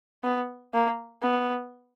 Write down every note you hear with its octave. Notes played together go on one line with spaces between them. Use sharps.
B3
A#3
B3